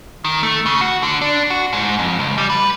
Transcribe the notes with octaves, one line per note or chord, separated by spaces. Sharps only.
D#3
A3
C#3
F#4
D3
D4
F#4
G#2
F2
C#2
G3
B4